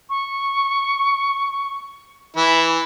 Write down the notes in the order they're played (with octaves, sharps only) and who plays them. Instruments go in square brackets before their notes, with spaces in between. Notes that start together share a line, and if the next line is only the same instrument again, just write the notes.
[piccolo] C#6
[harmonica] E3 E4